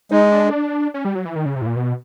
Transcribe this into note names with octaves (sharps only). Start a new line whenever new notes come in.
G#3 D#4
D4
C#4
G3
F#3
E3
D#3
C#3
C3
A2
A#2
B2